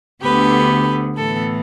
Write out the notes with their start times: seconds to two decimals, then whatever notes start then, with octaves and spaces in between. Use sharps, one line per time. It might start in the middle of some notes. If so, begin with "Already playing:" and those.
0.22 D2 D3 B3 G4 B4
1.17 A2 E3 B3 A4